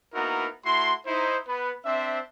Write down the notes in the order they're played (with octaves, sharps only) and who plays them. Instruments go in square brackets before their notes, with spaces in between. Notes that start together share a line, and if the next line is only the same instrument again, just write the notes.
[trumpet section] A#3 B3 D#4 E4 F#4 A#4
A3 E4 F#4 C6
D#4 E4 C5
B3 B4
C4 D4 C5 E5